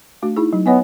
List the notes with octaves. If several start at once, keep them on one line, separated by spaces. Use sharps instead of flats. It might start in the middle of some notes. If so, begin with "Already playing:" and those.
A3 D4 F#4
D#4 E4 G#4
F#3 D#4
B3 C#5 D#5 G#5